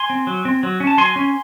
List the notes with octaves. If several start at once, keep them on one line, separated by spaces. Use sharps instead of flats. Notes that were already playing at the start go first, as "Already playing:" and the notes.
Already playing: G#5 C6
C4
F#3
C4
F#3
C#4
A5
F#3 G#5 C6
C#4